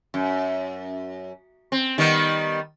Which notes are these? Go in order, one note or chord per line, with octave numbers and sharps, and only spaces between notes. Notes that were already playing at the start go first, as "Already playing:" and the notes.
F#2
C4
D#3 G3 B3